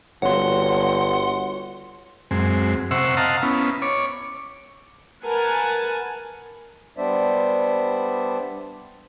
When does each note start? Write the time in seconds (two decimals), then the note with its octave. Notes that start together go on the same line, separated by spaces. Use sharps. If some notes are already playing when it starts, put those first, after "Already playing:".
0.22 G1 F#4 C#5 F#5 C6
2.31 F#2 G#3 C4
2.91 C3 C5 E5 F#5 C#6 E6
3.17 D#5 F5 F#5 A5 A#5 C6
3.43 B3 C#4 E4
3.82 C#5 D6
5.24 A#4 B4 F#5 G#5 A5
6.97 G3 B3 D4 C5 D5 E5